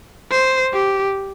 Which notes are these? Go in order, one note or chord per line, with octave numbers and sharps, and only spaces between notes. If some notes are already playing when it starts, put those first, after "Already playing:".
C5
G4